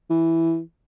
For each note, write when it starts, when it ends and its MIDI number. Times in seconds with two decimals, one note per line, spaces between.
0.10 0.60 52